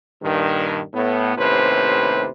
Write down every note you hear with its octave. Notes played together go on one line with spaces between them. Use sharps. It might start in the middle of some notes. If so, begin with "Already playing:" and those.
G2 A#2 D#3
A2 B3
D#2 A2 C3 C#4 B4 C5